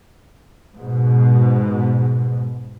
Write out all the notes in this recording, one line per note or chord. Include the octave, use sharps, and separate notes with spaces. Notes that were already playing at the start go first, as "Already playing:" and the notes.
G#2 B2